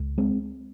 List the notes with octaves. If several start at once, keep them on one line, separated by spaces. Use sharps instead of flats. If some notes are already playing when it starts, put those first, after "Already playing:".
Already playing: C#2
G#3 C4